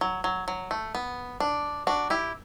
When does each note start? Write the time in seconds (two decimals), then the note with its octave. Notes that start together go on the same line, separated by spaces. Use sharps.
0.01 F#3
0.24 F#3
0.48 F#3
0.71 A3
0.95 B3
1.40 D4
1.87 D4 F#4
2.10 E4 G4